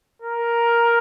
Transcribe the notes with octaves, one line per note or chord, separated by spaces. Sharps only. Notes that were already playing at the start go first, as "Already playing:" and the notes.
A#4